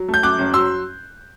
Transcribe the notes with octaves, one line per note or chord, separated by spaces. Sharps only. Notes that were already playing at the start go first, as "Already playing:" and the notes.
Already playing: F#3
A3
G6
F#2 D6 F#6
F#1
F#3 C6 E6